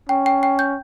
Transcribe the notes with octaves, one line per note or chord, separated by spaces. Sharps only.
C#4 G5
G5
G5
G6